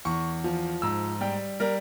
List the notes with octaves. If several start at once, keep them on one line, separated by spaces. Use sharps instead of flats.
E2 C#6
F3
G#2 E6
G3 G5
G3 A#4